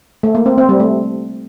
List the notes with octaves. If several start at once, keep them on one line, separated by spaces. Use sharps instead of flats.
A3
A#3
C4
C4
G3
A3